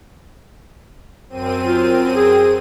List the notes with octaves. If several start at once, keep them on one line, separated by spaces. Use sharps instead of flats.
F#2 C4 D#7
F4
G#4